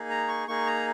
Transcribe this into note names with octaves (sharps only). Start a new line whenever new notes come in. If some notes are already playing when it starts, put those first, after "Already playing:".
Already playing: A#3 D#4 G#4
A#5
C#6
A#3 D#4 G#4 C#6
A#5